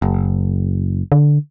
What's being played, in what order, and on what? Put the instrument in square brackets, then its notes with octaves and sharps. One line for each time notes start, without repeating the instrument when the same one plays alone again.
[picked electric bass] F#1
[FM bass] D3